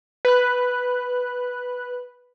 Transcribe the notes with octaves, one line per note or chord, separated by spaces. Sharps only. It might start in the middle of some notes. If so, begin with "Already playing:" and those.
B4 F#6